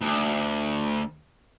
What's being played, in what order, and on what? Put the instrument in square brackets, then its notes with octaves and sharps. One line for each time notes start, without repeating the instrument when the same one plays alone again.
[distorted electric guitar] D2